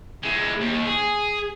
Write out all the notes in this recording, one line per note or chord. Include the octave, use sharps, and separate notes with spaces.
G#3 E4
D#2
G#4